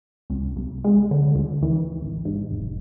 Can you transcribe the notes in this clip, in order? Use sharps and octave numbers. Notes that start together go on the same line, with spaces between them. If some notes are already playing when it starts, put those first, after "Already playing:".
C#2
C2
G#3
D3
D2
E3
A1
G#2
F1